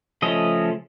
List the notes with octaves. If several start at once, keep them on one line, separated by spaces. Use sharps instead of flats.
C#3 F3 A3 C#4 D#5